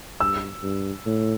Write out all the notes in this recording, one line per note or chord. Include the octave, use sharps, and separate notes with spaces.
G2 E6
G2
A2